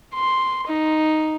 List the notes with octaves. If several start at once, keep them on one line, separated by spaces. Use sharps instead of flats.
C6
D#4